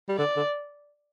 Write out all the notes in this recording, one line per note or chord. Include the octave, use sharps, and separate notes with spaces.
G3
D3 D5
D3